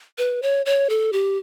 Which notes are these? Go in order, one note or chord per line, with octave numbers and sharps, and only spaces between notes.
B4
C#5
C#5
A4
G4